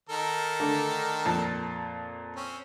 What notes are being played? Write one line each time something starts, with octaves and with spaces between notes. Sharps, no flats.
D#3 A4 A#4
D3 A3
F2 A#2 A5
C4 C#4